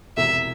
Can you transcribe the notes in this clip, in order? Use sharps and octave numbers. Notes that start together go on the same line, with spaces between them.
E1 E2 C3 E5